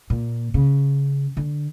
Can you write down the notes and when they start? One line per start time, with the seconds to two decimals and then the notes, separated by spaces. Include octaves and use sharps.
0.10 A#2
0.54 C#3
1.37 D3